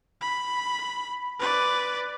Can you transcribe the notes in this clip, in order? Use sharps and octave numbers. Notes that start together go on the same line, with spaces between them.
B5
B4 D5